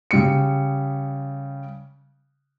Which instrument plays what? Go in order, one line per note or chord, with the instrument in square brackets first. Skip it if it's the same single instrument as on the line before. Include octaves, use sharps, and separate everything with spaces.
[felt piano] C#3 G3 C#7